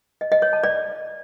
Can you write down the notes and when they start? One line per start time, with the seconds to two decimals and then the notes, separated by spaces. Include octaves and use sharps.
0.21 D#5
0.32 D#5
0.42 C#5
0.53 A5
0.64 D5